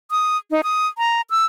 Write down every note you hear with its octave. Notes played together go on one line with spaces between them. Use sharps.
D#6
D#4
D#6
A#5
E6